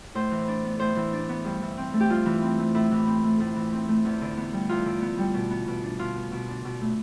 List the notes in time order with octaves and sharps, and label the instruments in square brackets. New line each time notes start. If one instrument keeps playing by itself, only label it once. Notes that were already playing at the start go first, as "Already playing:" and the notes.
[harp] A2 C5
E3
D4
B3
A2 C5
E3
D4
B3
G2
E3
C4
A3
G4
G2 F4
E3
C4
A3
A2 E4
E3
C4
A3
A2
E3
C4
A3
E2
D3
B3
G3
E2 F4
D3
B3
G3
B2
B3
B2
D4
B2 F4
B3
B2
D4
B2
A3